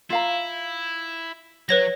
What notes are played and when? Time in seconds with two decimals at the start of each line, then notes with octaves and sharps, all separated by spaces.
0.10 E4 F4 F5 A#5
1.69 F#3 B4 C#5 A#6